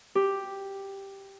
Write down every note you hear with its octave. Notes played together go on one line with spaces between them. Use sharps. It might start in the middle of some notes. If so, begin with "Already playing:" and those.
G4